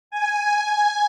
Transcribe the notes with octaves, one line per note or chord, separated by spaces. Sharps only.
G#5